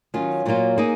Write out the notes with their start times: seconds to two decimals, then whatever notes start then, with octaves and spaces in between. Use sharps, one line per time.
0.14 D#3 F#3 C#4 F4
0.46 A#2 F#3 A#3 F4
0.78 A#3 D#4 G#4